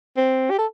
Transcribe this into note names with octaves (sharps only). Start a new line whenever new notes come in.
C4
G4
A4